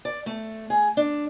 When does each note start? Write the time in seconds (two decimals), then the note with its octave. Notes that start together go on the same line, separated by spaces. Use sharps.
0.05 D5
0.26 A3
0.70 G#4
0.97 D4